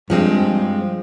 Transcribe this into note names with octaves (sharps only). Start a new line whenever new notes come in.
G2 F3 G#3 C4